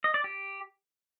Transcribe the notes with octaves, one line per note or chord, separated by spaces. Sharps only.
D#5
D5
G4